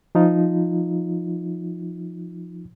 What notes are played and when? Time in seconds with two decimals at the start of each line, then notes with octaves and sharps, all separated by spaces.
0.15 F3 D#4 F4